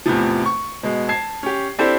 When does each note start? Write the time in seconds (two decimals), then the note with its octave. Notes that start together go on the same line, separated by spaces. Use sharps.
0.06 E2 A2 C3 F3
0.46 C#6
0.83 B2 G#3
1.08 A5 G#6 C7
1.43 C#4 G4
1.78 C4 D4 E4 G4 A4 C5